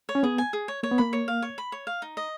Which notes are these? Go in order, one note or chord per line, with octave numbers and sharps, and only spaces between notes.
C#5
C#4
B3 G#4
G#5
G#4
C#5
A#3 C#5
B3
A#3 B5
C#5
F5
C#5
B5
C#5
F5
D#4
D#5